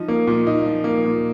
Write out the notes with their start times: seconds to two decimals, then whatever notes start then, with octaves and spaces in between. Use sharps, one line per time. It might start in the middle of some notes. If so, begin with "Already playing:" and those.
Already playing: F3 D#4
0.08 A#3
0.27 A#2
0.47 D#4
0.66 F3
0.84 A#3
1.05 A#2